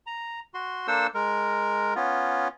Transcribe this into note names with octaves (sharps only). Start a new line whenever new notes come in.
A#5
F#4 C6
A#3 D4 A4 C5 E6
G#3 A#4
B3 C#4 F4